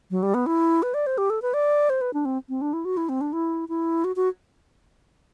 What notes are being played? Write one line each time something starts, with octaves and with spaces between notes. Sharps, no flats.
F#3
G3
B3
E4
B4
D5
C5
G4
A4
B4
D5
C5
B4
D4
C4
C4
D4
E4
F#4
E4
C4
D4
E4
E4
F#4
F#4